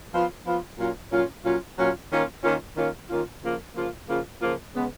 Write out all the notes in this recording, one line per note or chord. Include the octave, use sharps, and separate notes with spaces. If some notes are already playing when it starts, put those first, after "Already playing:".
F3 B3 F4
F3 B3 F4
A#2 F#3 C#4 F4
A#2 F#3 C#4 F4
A#2 F#3 C#4 F4
A#2 F#3 C#4 F4
D#3 A#3 C#4 F4
D#3 A#3 C#4 F4
D#3 A#3 C#4 F4
D#3 A#3 C#4 F4
C#3 F3 A#3 F4
C#3 F3 A#3 F4
C#3 F3 A#3 F4
C#3 F3 A#3 F4
C#3 G#3 B3